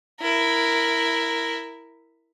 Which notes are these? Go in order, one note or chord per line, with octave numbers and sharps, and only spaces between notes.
E4 A#4